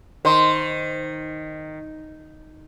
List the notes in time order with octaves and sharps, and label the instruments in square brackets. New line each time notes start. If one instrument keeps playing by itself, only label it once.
[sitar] D#3 [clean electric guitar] C5